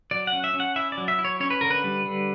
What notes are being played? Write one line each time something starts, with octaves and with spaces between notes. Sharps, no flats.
F#3 D5
F#5
C#4
E5
C#4
F#5
E4 E5
D5
F#3
E5
E4
C#5
C#4 C#5
B4
D3 A#4
B4
G3
D3